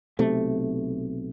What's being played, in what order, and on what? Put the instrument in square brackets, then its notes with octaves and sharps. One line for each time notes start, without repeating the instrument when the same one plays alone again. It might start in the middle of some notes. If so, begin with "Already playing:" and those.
[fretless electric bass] B1 C3 A3